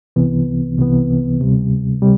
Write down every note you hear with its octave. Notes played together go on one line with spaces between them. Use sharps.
C2 C3 E3 B3
C2 C3 E3 B3
D2 C3 G3
C3 G3